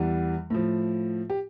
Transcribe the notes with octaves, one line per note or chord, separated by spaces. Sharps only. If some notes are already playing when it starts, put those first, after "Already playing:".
Already playing: E2 E3 G3
A2 F3
G4